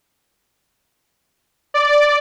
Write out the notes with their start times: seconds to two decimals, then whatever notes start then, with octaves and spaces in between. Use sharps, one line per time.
1.74 D5